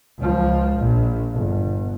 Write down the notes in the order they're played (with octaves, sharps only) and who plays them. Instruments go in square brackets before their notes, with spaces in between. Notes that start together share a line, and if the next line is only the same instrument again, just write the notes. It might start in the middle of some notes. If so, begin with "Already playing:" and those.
[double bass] C#2 F3
A#1
G1